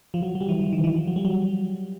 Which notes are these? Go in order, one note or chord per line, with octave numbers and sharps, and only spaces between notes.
F3
F#3
F#3
G3
E3
E3
D#3
E3
F3
F#3
G3
F#3